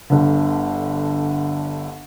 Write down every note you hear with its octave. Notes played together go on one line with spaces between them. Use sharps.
G1 D3